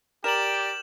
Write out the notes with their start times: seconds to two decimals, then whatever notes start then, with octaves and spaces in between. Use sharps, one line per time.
0.24 G4 A#4 D5 E7 F#7